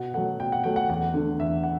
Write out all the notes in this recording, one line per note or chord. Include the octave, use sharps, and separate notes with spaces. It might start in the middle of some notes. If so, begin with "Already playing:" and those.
Already playing: B2 F#5
F#3 A3 F#5
B2 G5
F#5
F#3 A3 G5
F#5
E2 F#5
D3 A3
E2 E5
F#5